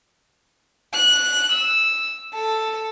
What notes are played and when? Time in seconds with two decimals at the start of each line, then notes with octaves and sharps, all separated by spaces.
0.94 F#6
1.52 E6
2.34 A4